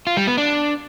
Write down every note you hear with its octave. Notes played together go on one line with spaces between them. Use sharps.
F4
G3
B3
D4